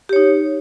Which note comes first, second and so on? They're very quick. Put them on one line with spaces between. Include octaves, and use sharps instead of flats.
G4 C#5 D#4